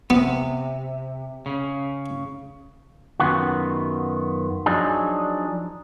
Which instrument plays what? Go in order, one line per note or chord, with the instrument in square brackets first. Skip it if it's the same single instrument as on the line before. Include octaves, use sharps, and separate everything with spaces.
[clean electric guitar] C3 [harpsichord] B3
[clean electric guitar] C#3
F#2 A#2 D#3 B3 F4 F#4
F3 F#3 D4 D#4 G#4